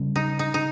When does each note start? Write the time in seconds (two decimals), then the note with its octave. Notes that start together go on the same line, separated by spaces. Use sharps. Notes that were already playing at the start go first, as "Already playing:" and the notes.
Already playing: C#3 G3 C#4
0.16 D#4
0.39 D#4
0.54 D#4